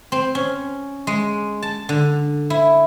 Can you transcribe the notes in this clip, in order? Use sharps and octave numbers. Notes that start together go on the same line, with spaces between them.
C4
C#4
G#3
A5
D3
E4